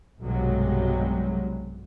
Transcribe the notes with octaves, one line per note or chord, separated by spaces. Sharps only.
B1 G2 C3 F#3 G#3